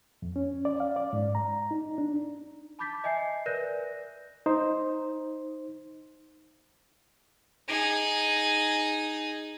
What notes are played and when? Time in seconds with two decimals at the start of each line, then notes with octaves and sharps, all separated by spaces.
0.22 F2
0.36 C#4
0.65 D5
0.80 F5
0.96 D5
1.13 G#2
1.35 A#5
1.71 D#4
1.98 D4
2.79 A5 B5 D6 G6 A6 B6
3.04 D#5 E5 G#5 G6 C7
3.46 A#4 B4 D5 F#6 G6 A#6
4.46 D#4 C5
7.68 D#4 G#4